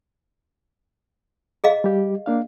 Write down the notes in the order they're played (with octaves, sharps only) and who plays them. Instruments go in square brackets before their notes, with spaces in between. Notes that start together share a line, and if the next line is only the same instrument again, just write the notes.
[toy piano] G#4 D#5 F5
[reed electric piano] G3 G4
A#3 D4 F5